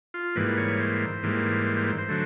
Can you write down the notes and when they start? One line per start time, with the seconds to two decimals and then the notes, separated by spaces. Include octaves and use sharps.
0.14 F4
0.36 G#2 E3 G3 A#3 B4
0.57 C#5
0.80 C5
1.23 G#2 E3 G3 A#3
1.66 C5
1.77 C5
1.87 C5
1.98 C5
2.08 D3 F#3 A3